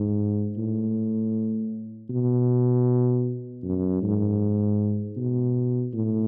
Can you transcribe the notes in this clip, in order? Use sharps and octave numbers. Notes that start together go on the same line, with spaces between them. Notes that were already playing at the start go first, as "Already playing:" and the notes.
Already playing: G#2
A2
B2
F#2
G#2
B2
A2